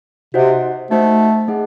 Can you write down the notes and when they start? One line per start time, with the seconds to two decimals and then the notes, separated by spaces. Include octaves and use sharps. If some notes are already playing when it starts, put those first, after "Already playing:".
0.34 C3 D#4 F#4 C5 D#5 F#5
0.91 A3 D#4 F#4 C5 D#5 F#5
1.48 A3 D#4 G#4 D#5 F#5